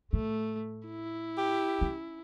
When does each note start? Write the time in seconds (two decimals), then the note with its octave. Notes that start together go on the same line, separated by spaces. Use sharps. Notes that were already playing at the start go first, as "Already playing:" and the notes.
0.13 A2 A3
0.88 E4
1.38 G4
1.81 C#4